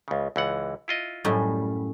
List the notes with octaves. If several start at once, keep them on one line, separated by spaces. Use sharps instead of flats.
C#2 C#3
C#2 E3 F#5
E4 F4 D#5
F#2 A2 G3